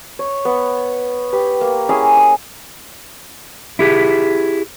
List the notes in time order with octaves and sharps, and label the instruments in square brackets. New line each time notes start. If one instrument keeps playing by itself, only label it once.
[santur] C#5
B3
G4 B4
A#3
C#4 E4 G#4 A#5
D#6
[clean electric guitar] E4 G4 G#4